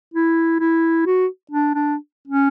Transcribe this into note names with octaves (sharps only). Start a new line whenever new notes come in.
E4
E4
F#4
D4
D4
C#4